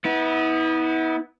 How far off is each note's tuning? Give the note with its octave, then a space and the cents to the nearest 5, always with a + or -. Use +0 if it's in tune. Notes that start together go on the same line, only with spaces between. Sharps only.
B3 +0 E4 -40